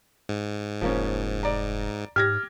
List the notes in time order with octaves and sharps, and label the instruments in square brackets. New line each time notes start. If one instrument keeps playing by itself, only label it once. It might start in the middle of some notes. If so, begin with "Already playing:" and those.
[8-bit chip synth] G#2
[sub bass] F1 [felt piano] F3 A#3 C#4
[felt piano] D5 A#5
[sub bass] G#2 [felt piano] G4 G#6 A#6 [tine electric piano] F6